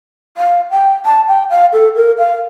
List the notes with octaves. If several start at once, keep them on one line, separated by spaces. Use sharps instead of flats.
F5
G5
A5
G5
F5
A4
A#4
F5